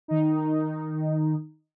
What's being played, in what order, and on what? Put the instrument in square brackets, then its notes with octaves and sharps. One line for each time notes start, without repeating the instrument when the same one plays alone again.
[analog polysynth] D#3 D#4